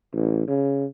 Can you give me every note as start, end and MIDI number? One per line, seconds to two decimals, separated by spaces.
0.13 0.44 33
0.48 0.85 49